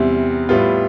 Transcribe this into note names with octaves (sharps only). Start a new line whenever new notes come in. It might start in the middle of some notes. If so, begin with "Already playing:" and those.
Already playing: E2 C3 G3 C4 E4
A2 G3 B3 F4